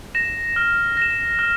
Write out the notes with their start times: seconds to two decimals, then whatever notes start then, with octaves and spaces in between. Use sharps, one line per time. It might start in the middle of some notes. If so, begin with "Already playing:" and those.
0.15 A#6 E7
0.56 F6
0.97 A#6 E7
1.39 F6